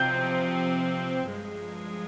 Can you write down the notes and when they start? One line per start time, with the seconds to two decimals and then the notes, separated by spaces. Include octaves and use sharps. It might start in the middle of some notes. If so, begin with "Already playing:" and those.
Already playing: C3 F3 C4 G6
1.27 G2 F3 G#3